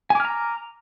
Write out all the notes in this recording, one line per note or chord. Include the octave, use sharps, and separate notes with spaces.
G#5 A#5 D6 F6